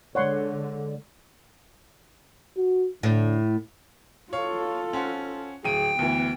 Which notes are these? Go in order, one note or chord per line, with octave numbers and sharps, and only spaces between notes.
D3 G#3 C#5 D5 F#5 C6
F#4
A2 D3
F4 A4 C#5 F5
C#4 C5 F#5
D1 G#4 G5 D#7
D2 E3 B3